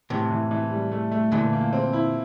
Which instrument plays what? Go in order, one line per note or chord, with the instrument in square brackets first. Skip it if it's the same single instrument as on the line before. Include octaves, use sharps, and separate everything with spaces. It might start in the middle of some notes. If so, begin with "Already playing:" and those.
[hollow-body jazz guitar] A2 C3 [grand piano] E3
[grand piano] E3
E3
G3
A3
A3
[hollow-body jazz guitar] A#2 D3 [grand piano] E3
[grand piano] A#3
C4
E4